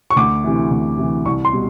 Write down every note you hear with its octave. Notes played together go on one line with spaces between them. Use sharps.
C#6
D2 D6
C3 E3
D2
C3 E3
C2 C#6
C6
B2 G3